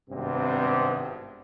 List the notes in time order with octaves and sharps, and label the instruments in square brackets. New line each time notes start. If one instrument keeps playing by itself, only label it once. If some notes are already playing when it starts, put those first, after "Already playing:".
[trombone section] G#1 G2 C3 B3 C4